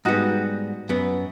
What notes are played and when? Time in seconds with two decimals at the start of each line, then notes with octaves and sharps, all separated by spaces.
0.05 G#2 G3 B3 D#4 F#4
0.89 F#2 B3